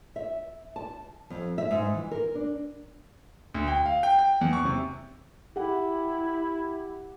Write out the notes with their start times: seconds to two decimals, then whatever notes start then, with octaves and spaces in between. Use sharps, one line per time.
0.16 E5
0.76 A5
1.30 F2
1.58 E5
1.71 G#2
1.94 E3
2.11 A#4
2.35 D4
3.54 D2
3.67 G5
3.86 F5
4.03 G5
4.18 G5
4.41 E2
4.53 C#6
4.65 C3
5.56 E4 G4 F#5